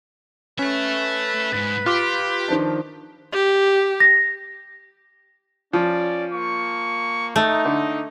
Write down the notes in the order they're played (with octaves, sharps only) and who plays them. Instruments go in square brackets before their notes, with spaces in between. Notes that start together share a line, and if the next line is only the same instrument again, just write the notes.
[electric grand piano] C#4 [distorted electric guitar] A4 E5 [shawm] B4
[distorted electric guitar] G#2 [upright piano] A6
[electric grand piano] F4 D6 [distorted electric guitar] G4 [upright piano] F6
[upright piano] D#3 F3 D4
[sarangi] G4
[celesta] A#6
[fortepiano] F3 [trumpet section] C#4 D5
[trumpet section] A#3 C#6
[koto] A3 [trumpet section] D#4
[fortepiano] D3